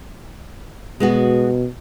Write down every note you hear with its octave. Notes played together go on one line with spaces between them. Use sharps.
B2 G#3 B3 F#4